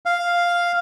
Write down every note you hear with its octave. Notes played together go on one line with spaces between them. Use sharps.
F5